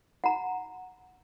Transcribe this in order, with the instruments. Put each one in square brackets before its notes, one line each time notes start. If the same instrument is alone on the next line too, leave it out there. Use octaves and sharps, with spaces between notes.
[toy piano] F#5 A#5